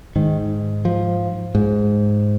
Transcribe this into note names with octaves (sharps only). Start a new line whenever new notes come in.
G#2 D#3
F3
G#2